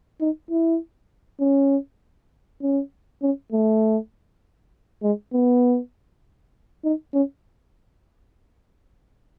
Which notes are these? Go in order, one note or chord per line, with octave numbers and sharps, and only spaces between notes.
D#4
E4
C#4
C#4
C#4
A3
G#3
B3
D#4
C#4